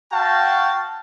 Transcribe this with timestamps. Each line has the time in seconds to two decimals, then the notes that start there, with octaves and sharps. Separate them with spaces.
0.13 F#4 F5 G5 A5